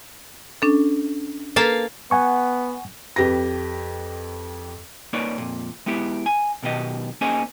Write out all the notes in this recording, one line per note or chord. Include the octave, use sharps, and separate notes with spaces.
C#4 D4 A4
A#3 A4 B4 F5 A5
B3 F#5 G#5 C#6
F2 G4 B4 A#6
A#3 D#4 B4 C#5 D5
F2 A#2
G#3 B3 E4 G4
G#5
B1 B2 D#3 G4 D#5
A#3 C#4 D#4 G#4 C5 G#5